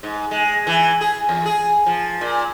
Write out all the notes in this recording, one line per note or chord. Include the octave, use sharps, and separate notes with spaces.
G#2
G#3
E3
G#4
E2
G#4
F3
A#2